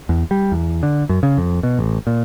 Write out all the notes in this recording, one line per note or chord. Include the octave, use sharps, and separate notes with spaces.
E2
G3
E2
D3
F#2
C#3
F2
B2
A1
A#2